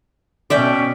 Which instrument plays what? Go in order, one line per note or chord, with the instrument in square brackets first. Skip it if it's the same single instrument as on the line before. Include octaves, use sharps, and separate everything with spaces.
[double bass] B2 C#4 [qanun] D5 E5 G5